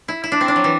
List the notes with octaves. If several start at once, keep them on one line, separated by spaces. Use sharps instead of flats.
E4
E4
D4
C4
D4
F#3
E3